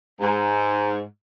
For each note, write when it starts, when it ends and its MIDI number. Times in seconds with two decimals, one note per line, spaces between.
0.21 1.01 44